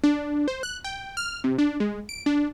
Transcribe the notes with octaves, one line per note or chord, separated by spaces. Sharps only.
D4
C5
F#6
G5
F6
C3
D4
G#3
D7
D4